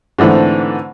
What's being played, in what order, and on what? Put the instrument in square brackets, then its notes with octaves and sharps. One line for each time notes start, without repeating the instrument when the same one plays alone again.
[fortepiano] G#2 D3 E3 A3 C4